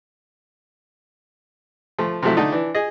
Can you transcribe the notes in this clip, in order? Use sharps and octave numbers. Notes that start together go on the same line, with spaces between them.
F3 A3
C3 F3 F#3 A3 E4
D3 A3 D4 D#4
E3 D4
G#4 D#5